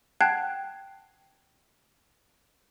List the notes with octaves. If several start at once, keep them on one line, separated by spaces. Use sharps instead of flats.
F#5 G5 A5 F#6 G#6 C7